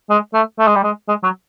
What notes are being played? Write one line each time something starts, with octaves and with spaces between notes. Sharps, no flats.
G#3
A3
A3
G#3
G3
G#3
G#3
F#3